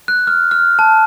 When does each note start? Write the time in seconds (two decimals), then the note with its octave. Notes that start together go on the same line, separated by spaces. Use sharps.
0.08 F#6
0.27 F6
0.51 F6
0.79 A5